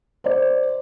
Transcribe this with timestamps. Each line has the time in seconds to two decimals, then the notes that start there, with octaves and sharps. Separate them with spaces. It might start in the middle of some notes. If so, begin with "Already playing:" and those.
0.24 C5 D5